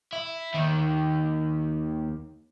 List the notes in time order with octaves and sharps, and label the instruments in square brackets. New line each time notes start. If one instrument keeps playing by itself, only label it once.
[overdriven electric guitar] E4
D#2 D#3